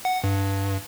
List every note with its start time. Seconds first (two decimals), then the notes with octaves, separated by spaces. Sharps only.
0.05 F#5
0.24 G2